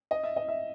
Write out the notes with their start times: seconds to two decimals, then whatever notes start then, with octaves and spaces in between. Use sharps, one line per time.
0.11 D#5
0.23 E5
0.36 D#5
0.48 E5